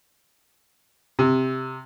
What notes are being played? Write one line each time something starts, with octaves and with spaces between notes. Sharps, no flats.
C3